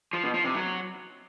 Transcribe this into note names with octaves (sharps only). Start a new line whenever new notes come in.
F3
B2
F3
C3
F#3